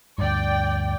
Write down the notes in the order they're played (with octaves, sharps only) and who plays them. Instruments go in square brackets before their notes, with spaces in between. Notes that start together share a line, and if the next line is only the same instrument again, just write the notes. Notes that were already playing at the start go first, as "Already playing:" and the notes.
[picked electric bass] D2 G2 [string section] D5 G5